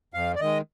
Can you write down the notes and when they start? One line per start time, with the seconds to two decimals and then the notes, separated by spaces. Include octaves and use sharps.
0.14 F2 F5
0.35 D5
0.40 D#3 G#3 D#5